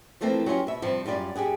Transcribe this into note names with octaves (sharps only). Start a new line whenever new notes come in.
E3 F3 A3 A#3 C4
F#3 C#4 F4 G4
B2 E5
G2 C3 F3
F#2 G3 F4 D5
F#2 G4 G#4 F#5